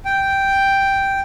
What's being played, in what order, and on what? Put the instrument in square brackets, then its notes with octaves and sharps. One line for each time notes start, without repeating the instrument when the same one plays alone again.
[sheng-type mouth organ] G5